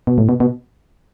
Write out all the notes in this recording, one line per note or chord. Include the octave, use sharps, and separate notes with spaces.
B2
A2
B2
B2